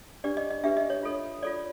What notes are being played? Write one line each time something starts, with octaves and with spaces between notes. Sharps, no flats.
D4 G4 B4 D5
D#5
D#5
D4 G4 B4 E5
D#5
C#5
F4 A4 C#5
F4 A4 C#5 D5